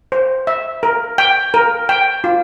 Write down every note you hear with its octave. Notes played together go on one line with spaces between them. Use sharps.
C5
E5
A#4
G5
A#4
G5
F4